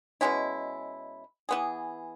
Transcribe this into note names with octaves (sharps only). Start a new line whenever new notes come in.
B2 G#3 C#4 E4
E3 B3 G#4